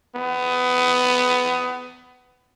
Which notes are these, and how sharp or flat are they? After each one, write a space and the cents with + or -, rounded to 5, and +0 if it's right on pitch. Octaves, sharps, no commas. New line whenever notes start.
B3 +20